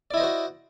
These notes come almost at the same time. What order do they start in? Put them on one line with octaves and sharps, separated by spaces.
D5 E4 D#5 C5 F#4